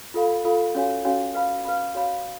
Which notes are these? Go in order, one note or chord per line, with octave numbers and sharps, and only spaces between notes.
F4 A4 F5 B5
F4 A4 F5 B5
C#4 F#4 C#5 F5 G#5
C#4 F#4 C#5 F5 G#5
B4 F5 B5
B4 F5 B5
F#4 C#5 F5 B5